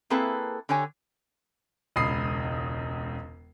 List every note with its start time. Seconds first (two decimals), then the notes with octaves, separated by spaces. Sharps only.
0.10 A#3 C4 E4 G#4 A4 B4
0.69 D3 G4 C#5 G#5
1.96 E1 C#2 B5 D#6 C7